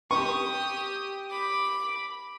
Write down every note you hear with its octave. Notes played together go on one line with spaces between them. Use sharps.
G4 C#6 D#6
B5 D6